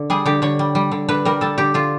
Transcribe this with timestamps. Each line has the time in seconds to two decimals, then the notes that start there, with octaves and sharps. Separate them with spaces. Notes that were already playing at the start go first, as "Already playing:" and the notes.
Already playing: D3
0.10 G3 G#4
0.25 D3 G4
0.42 D3 C#5
0.59 G3
0.75 G3
0.91 D3
1.08 D3 B4
1.25 G3 A#4
1.41 G3 A4
1.58 D3 G4
1.74 D3 F4